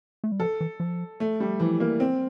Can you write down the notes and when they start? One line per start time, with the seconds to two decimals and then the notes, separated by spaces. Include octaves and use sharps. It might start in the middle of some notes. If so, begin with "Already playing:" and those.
0.24 A3
0.32 G3
0.40 F3 A4
0.61 E3
0.80 F3
1.20 A3
1.40 G3
1.60 E3 F3
1.80 A#3
2.00 C4